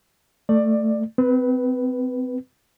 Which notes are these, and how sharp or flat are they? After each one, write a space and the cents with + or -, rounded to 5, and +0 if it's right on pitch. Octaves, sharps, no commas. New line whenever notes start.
A3 +10 D5 +15
C4 -30 B4 +0